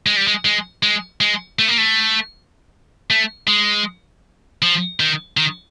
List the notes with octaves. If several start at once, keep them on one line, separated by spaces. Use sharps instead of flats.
G#3
G3
G#3
G#3
G#3
G#3
A3
A#3
A3
A3
G#3
F3
D#3
D#3